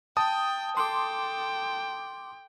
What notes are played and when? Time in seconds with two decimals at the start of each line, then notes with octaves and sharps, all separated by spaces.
0.17 G5 A5 D#6
0.77 A4 G5 C6 D6